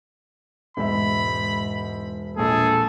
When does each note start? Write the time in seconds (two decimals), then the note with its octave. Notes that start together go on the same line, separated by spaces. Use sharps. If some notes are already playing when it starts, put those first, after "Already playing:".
0.77 E1 G#2 E5 B5
2.37 A#1 A#2 G#4 A4